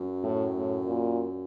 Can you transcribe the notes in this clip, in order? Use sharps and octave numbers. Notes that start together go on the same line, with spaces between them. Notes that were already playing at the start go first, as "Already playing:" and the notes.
Already playing: F#2
A2
A2
A#2